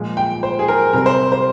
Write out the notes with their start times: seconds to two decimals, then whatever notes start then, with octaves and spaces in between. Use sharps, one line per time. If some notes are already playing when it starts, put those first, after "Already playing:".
Already playing: A#2 F3 G#3
0.17 G5
0.43 C5
0.59 G#4
0.68 A#4
0.93 C3 G3 A#4
1.06 C5
1.32 C5